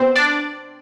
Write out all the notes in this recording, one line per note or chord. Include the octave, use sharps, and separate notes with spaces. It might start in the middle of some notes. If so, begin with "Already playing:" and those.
Already playing: B2 C4 C5
D4 D5